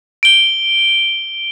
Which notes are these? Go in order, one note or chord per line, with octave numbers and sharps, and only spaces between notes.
D7 G7